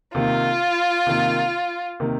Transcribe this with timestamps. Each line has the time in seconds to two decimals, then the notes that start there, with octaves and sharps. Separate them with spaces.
0.15 C3 D#3 A#3 F4
1.07 C3 D#3 A#3
2.00 C3 D#3 A#3